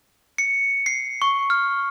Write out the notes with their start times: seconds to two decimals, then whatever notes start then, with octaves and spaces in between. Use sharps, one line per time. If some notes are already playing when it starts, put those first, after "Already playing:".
0.38 C#7
0.86 C7
1.22 C#6
1.50 F6